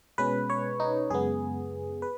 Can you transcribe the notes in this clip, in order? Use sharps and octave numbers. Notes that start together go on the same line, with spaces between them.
B2 G#3 C#4 B4
C#5
D#4
F#2 C#3 G#3 B3 G#4
B4